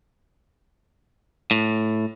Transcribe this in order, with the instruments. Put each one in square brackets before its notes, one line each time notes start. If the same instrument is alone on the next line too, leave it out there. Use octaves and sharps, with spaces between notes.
[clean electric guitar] A2